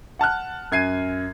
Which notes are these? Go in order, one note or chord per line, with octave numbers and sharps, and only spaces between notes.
F#5 A5 F6 F#6
F#2 G#6 C7 D#7